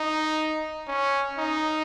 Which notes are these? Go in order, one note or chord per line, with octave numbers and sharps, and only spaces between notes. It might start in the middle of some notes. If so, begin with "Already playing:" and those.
Already playing: D#4
C#4
D#4